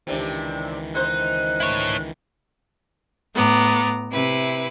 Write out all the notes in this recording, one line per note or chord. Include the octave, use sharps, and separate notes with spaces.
C#2 C3 D#3 E3 D4
D#4 C5 F#6
E4 C#5
A2 B3 A#5 D6
C3 E4 B4